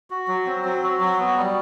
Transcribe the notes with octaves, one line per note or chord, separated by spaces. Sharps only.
F#4
F#3
C4
F#3
F#4
F#3
B3
G3